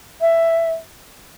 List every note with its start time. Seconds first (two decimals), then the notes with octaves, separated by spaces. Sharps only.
0.21 E5